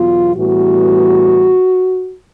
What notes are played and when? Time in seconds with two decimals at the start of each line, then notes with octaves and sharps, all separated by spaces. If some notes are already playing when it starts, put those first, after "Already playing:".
Already playing: E2 B2 F#3 B3 F4
0.36 A2 E3 G3 B3 F#4